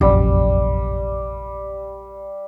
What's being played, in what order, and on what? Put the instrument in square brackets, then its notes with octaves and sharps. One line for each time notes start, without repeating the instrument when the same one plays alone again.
[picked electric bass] F1 A#1 F#2 [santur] G3